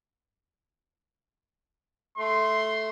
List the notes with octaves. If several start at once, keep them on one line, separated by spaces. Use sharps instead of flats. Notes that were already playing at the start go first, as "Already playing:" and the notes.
A3 C6